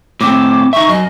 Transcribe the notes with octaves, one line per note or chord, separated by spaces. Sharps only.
A2 C4 D6
D#4 E5 C#6
F#2 D#5